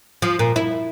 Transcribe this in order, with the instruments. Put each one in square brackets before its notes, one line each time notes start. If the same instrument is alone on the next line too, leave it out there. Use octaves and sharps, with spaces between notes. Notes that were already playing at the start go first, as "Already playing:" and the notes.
[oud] F3
A#2
E4